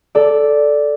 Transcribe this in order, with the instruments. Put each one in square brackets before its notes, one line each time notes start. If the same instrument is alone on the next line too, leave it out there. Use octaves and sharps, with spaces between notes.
[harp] A4 D5